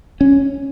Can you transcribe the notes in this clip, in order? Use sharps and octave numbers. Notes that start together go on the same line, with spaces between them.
C#4